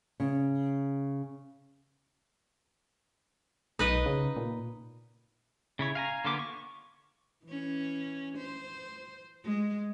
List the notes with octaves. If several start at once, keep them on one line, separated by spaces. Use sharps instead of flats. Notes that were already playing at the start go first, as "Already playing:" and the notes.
C#3
B1 D#4 B4 D#5
C#3
A#2
C#3 E4 C#5
F5 G#5 A#5
D3 A#3 B3 F4 D6
C#6
E3 C#4
C5
G#3